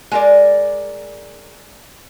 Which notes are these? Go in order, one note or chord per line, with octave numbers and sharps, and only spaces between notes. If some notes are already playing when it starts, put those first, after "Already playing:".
G#3 A#4 D5